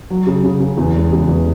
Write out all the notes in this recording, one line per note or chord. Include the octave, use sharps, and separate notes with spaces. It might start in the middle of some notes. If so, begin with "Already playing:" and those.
F#3
C#3
C#3
C#3
E2
G#3
C#3
E2